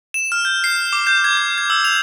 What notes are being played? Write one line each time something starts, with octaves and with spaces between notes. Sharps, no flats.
E7
F6
G6
C7
D6
G6
G#6
G#6
G#6
E6
F7